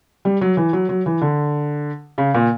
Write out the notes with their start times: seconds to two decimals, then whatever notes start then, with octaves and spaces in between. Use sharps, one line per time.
0.25 G3
0.41 F#3
0.57 E3
0.73 F#3
0.89 F#3
1.06 E3
1.22 D3
2.18 C#3
2.35 A#2